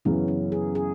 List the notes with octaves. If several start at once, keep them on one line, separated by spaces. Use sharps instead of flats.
F#2 C#3 E3 B3
C#4
G#4
G#4